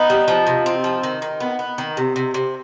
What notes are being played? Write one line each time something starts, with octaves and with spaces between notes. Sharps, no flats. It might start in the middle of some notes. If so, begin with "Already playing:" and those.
Already playing: B3 D#4
G3
F3
C3
C4
F3
D#3
D#3
B3
B3
D#3
C3
C3
C3